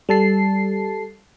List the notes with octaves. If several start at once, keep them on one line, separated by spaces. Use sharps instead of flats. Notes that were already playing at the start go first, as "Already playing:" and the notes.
G3 A4 A5 C7